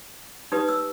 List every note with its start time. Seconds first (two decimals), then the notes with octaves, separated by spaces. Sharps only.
0.52 D#4 G4 B4 D#6
0.69 E6